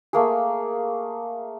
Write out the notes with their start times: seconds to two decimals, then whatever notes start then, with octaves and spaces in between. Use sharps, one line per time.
0.13 A3 A#3 G#4